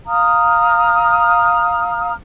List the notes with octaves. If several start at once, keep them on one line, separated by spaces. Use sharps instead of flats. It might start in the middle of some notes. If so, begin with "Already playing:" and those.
F5 A#5 D#6 F6